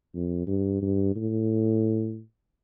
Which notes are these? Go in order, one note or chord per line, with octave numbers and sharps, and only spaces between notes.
F2
G2
G2
A2